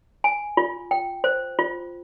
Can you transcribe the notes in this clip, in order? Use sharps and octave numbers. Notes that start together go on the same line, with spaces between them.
G#5
F4
G5
C5
F4